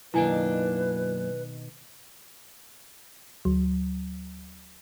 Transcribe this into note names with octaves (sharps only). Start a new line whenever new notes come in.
F#2 B2 D#3 A#3 D4 E4 B4 G#5
D2 F#3